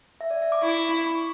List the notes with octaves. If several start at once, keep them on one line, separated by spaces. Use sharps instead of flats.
E5
D5
E5
D6
E4 C#6
C#6